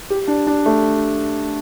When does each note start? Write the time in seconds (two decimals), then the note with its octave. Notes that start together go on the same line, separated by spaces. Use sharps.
0.10 G4
0.28 D4
0.47 D4
0.66 A3